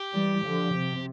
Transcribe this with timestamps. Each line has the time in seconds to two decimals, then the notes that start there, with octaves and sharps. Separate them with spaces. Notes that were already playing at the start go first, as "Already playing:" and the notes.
Already playing: G4
0.13 E3 G3
0.44 D3 F3
0.74 C3